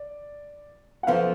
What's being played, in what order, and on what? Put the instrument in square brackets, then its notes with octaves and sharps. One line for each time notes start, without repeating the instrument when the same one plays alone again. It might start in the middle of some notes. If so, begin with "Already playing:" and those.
Already playing: [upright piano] D5
F#5
[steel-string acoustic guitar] F#2 F3 B3 F4 A4 [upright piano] F5